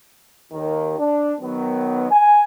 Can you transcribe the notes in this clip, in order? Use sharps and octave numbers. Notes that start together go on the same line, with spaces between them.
D#2 D#3
D4
D#3 F#3 B3
G#5